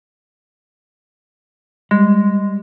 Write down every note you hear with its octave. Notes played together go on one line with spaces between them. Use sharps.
G3 G#3